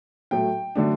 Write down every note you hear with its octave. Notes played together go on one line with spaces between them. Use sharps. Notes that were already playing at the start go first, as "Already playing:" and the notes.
A2 F#3 A3 G5
D3 F#3 A3 D4